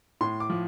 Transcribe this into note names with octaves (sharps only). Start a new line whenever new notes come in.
A2 C6
D6
F3